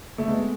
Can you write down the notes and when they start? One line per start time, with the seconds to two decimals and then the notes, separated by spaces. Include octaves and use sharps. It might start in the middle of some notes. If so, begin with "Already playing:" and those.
0.18 A3
0.28 G#3 B3